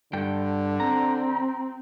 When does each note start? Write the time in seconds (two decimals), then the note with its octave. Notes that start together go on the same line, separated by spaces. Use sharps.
0.13 G2 D3 G5
0.80 C4 A#5